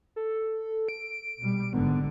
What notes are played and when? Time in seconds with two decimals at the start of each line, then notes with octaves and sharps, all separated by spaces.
0.16 A4
0.89 D7
1.41 B2 G3
1.73 G#1 G#2 D3 B3